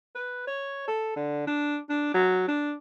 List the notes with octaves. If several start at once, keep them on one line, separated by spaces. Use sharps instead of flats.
B4
C#5
A4
D3
D4
D4
F#3
D4